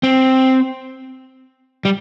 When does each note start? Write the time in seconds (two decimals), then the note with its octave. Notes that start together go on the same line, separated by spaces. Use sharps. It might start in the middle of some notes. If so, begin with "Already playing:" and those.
0.03 C4
1.85 G3